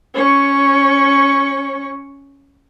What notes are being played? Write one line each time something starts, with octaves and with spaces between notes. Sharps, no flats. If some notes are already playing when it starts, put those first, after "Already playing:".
C#4 C#6